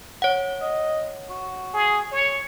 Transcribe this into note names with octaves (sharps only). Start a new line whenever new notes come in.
C#5 F#5
D#5
F#4
G#4
C#5